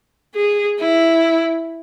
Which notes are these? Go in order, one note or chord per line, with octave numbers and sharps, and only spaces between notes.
G#4
E4